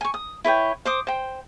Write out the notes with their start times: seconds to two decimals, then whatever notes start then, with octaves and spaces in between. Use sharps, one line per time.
0.01 G#5 C#6
0.14 D#6
0.44 E4 B4 C#5 G5
0.85 C5 D6 D#6
1.07 C5 G5